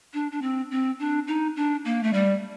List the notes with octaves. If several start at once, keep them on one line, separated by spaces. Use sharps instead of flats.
D4
D4
C4
C4
D4
D#4
D4
A#3
A3
G3